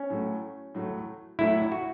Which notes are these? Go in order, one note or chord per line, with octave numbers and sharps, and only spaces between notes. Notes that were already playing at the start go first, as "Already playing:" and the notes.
Already playing: C#4
A2 F#3 A3
A2 F#3 A3
A2 F#3 A3 E4
F#4